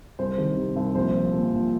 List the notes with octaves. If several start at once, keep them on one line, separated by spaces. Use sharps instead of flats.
C2 C5
D#3
C3
C2
A#1 C5
F3
A#2
A#1